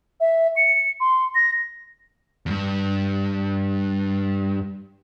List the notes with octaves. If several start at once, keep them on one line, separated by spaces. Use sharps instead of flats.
E5
C#7
C6
A#6
E2 G2